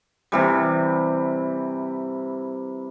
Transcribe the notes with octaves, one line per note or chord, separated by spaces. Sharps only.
C3 E3 G3